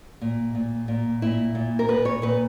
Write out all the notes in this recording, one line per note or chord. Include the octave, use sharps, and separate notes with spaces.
A#2
A#2
A#2
A#2 E4
A#2
A#4
A#2 B4
C#5
A#2 B4